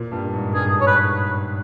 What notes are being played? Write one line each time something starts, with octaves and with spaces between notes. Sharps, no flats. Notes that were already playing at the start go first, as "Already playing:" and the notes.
Already playing: A#2
G2
G#2
G2 G#4
C#5
B4